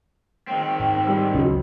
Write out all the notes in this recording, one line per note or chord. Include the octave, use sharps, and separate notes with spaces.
D#3 C4
G#2
G3 E6
C#2 C#3 F#3